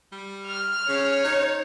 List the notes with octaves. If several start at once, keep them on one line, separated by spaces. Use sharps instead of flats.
G3
F6
C#3 C#5
D#4